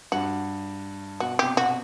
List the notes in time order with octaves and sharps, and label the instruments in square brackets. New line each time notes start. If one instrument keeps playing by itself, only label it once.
[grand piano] G2 [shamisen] F#4
[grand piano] B2 [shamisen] F#4
[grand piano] C3 [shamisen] G4
[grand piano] B2 [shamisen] F#4